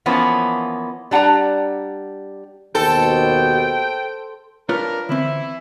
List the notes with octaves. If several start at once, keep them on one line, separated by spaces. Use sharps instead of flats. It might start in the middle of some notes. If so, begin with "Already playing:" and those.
E3 F3 A#3 B3 C#4
G3 D4 F#5 A5 A#5
D#2 B2 A4 C5 G5 A5 C6
D4 F4 A#4 B4 C#5
D3 E3 C4 E4